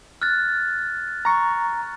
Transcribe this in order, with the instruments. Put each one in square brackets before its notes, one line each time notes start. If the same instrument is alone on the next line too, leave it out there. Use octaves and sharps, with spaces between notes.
[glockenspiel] F6 F#6 A6
[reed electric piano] A#5 C#6